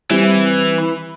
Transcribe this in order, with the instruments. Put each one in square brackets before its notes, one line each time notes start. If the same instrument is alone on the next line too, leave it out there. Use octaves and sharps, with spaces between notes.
[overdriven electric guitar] E3 [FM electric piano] G3 C4
[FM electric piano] B5